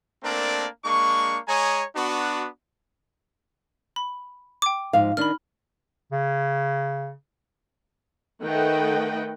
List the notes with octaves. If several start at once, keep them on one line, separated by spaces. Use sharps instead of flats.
A3 A#3 C4 D4 A#4 D5
G#3 A#3 D4 C#6
G#3 C#5 G#5 A#5 C#6 D#6
B3 D4 F#4
B5
G5 D6
G#2 F3 F5
D#3 D4 B5 F6
C#3
D#3 A3 B4 D#5 F#5 G5